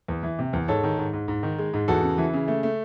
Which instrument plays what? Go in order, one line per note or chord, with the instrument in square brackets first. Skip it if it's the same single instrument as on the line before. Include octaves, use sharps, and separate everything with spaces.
[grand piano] E2
E3
C3
E2
G#2 A4 C#5
D#3
G#2
G#2
G#2
D#3
G#3
G#2
E2 F#4 A4
C#3
E3
C#3
A3
A3